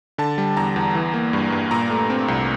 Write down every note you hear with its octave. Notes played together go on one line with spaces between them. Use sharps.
D3 A5
G3
E2 A#5
E2
E3
A#3
G2
G2
A#2 A#5
A3
C4
C2